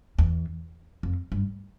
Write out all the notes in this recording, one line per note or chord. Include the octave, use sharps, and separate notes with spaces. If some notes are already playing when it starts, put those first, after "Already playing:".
E2
F2
G2